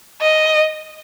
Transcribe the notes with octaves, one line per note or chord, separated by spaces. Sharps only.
D#5